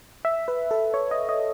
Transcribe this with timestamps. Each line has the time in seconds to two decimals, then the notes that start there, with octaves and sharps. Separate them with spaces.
0.25 E5
0.48 B4
0.71 A4
0.94 C#5
1.11 D#5
1.29 D#5